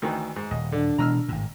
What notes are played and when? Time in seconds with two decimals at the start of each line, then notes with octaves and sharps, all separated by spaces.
0.02 D2 D#3 E3
0.36 G#2
0.51 D#1 D#5
0.72 D3 D4
0.98 B2 E3 G#3 A#5 E6 F6
1.28 G#1 A2